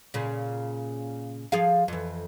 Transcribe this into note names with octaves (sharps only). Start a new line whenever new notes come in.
A#2 C#3
F3 G#4 F5
F2 E3